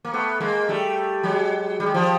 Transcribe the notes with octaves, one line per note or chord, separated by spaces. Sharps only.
A#3
A3 B3
G#3 A#3
G3 A3
F#3 G#3
G3
G#3
F3 G3